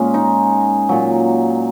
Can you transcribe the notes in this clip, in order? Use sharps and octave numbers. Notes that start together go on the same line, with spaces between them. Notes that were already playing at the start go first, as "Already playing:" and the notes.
Already playing: A#2 G#3 C#4
D#4
A#2 F#3